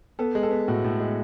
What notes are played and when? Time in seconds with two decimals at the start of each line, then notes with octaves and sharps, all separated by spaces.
0.19 B3 A4
0.35 G#3
0.43 A4
0.51 B3
0.68 A2 F#4
0.84 A2
1.00 G#3